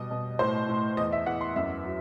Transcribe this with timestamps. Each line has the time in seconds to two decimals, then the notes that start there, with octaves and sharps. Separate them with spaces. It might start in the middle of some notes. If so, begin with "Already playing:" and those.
Already playing: B2 G3 D#5
0.11 B2
0.39 A2 C5
0.69 A2
0.97 E2 D#5
1.13 E5
1.26 E2 F#5
1.41 C6
1.56 F#2 E5
1.85 F#3